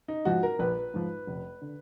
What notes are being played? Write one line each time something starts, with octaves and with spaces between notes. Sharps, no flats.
D#4
G#2 F3 F#4
A#4
A#1 B4
G#2 F3
F1
D3